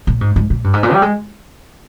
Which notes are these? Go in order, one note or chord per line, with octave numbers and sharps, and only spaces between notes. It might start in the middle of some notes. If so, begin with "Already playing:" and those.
A#2
G#2
G#2
A#2
G2
G#2
A#2
G3
G#3